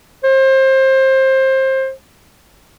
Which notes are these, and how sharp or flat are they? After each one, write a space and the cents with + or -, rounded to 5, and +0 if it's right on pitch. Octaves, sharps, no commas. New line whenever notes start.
C5 +25